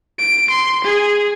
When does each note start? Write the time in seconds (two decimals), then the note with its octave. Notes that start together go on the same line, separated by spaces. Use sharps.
0.19 D7
0.50 C6
0.84 G#4